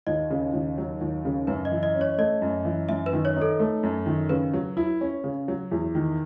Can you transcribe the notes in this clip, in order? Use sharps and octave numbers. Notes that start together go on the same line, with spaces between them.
D#2 D#5
C#3
D#2
F#3
D#2
C#3
F#2 B4
D#5
E3
D#5
C#4
C#5
A3 D#5
F#2
E3
F#2 E5
B4
D#3
C#5
D#4 A4
A3
F#2
D#3
C#3 B4
F#3
E4
C#4
C#3
F#3
E2
D#3